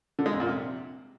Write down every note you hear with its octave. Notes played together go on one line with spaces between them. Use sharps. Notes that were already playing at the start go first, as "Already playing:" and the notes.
D3
G#3
F2
A#2
C3